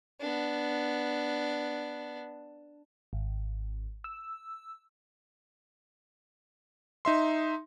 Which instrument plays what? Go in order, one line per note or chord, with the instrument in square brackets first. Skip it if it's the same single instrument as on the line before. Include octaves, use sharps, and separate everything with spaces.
[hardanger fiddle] B3 D4
[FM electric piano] G#1
E6
[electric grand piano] D#4 E5 C6